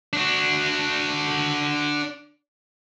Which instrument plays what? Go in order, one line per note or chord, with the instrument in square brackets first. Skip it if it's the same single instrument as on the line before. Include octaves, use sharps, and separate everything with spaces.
[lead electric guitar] D4 F#4